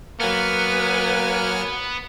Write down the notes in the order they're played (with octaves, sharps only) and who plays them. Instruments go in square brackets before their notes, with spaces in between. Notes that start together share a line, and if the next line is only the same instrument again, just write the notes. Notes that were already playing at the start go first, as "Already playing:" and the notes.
[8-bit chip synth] F#3 G#5 F6 [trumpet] A#3 [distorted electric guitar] B3 [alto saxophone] B4